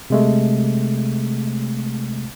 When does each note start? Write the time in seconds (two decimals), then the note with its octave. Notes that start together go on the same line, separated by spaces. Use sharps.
0.10 C3 G#3 A3